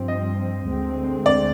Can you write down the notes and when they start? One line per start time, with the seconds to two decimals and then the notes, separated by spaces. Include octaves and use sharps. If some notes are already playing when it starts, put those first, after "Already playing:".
Already playing: G2 F3 C4
0.08 D#5
0.67 D2 D3 G#3 C4
1.26 D5